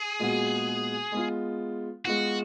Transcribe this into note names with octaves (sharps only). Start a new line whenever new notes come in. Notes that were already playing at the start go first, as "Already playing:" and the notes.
Already playing: G#4
A#2 G#3 B3 F#4
G#3 B3 F4
G#3 B3 F4 F#4